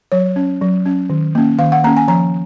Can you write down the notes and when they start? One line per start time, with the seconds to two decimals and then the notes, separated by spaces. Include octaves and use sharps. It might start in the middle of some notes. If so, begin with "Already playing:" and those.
0.12 F#3 C#5
0.36 C#4
0.61 F#3
0.86 C#4
1.10 D#3
1.35 A#3 C#4
1.59 D#3 F5
1.72 F#5
1.84 A#3 C#4 A#5
1.97 G#5
2.08 F3 A#5